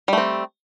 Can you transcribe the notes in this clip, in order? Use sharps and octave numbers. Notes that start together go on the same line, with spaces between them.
G3 A3 C4